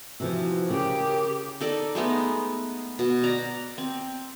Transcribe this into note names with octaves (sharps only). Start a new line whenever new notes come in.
C3 E3 F3 F#4
C#3 G4 A#4
D#4 A4 D5
G#3 A3 B3 D#4
B2
D5 A#5
C4